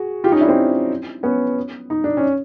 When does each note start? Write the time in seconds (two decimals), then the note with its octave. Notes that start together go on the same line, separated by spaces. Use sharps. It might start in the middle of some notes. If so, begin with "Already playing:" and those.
Already playing: F#4 G#4
0.24 F4 G4
0.32 C#4 D#4
0.41 D4 E4
0.49 C4
1.23 B3 C#4
1.90 D#4
2.04 D4
2.17 C#4